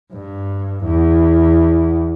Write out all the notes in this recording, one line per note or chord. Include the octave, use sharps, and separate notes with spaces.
G2
E2